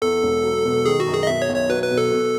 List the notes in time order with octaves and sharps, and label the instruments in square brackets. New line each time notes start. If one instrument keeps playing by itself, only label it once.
[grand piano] E2 [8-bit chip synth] A4
[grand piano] E1
F#3
B2
[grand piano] D#3 [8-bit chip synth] G#4
[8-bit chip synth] F#4
[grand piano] F#2
[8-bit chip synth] G#4
D#5
[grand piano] B2 [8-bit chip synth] E5
[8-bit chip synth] C#5
[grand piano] B1
[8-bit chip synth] C#5
[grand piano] F#3 [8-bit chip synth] B4
[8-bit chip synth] B4
[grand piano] B2
[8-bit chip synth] A4
[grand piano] B2